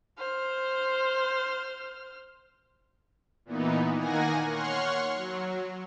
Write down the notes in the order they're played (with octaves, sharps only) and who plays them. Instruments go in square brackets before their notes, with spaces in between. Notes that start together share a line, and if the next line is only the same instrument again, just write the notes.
[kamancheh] C5 F6
[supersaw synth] A#2 E3 B3 D#4
D#3 A#3 F#5 G#5 A#6
C#5 F#5 C6 C#6 F6
F#3